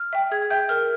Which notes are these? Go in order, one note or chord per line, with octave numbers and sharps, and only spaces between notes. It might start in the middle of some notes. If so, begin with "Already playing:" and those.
Already playing: F6
E5 G5
G#4 G#6
E5 G5 G6
A#4 F6